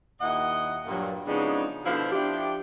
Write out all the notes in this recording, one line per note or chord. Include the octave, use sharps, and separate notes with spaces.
D#2 A#2 E4 D#5 F#5
G2 A#2 F#3
C#3 F3 G#3 B3 D4 D#4
B2 D3 F3 E4 C5
F3 D4 E4 G4